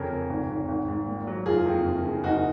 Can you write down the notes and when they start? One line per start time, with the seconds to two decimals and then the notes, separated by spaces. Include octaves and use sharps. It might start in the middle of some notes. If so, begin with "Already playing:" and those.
Already playing: F2 C#3 A#4 C#5
0.10 F2
0.30 G#1
0.49 G#1
0.69 G#1
0.88 G#2
1.07 A#2
1.27 F#3
1.46 F#1 F4 G#4
1.66 F2
1.85 F#1
2.04 C#3
2.24 F#1 D#4 F#4